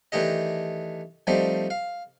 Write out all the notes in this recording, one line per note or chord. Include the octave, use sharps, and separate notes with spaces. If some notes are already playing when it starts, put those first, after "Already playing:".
D#3 E3 A3 D4 G4 D#5
F3 G3 A3 C4 D#4 D5
F5